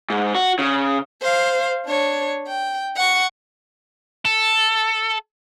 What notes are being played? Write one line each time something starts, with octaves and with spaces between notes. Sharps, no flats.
G#2
F#4
C#3
C5 F5
D4 C#5
G5
F#5 C#6
A4